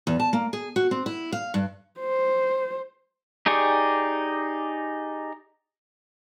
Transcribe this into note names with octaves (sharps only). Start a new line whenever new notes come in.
E2
A5
A#3
G#4
F#4
C4
E4
F5
G2
C5
D#4 G4 G#4 D5 C#6